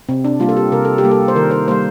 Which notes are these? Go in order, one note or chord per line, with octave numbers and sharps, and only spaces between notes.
C3 C4
D4
G3 A#3 F4
A4
G4
C3 A#4
A4
G4
G3 A#3
A4
C5
D#3 A#4
C5
G3 A#3 C5